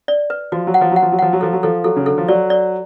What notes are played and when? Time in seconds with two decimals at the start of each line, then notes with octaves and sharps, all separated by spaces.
0.08 D5
0.30 B4
0.52 F3 F#4
0.67 F#3
0.74 F#5
0.81 F3
0.92 F#3 F#5
1.02 F3
1.12 F#3
1.19 F3 F#5
1.33 F#3
1.41 F3 A4
1.53 F#3
1.63 F3 A4
1.84 F#3 A4
1.96 C#3
2.06 D3 A4
2.18 F3
2.28 F#3 D5
2.50 D5